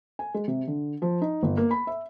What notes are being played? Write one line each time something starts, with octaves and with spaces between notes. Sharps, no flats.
G#5
G#3
C3
D3
F3
D#4
G1
A#3
B5
E5